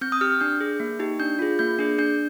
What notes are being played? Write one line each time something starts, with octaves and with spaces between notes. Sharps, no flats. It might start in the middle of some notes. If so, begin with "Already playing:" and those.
C4 G6
D#6
G4 F6
D4 G6
G#4
A#3
D#4 G4
D4 G6
F4 G#4
A#3 G6
D4 G#4
D4 G6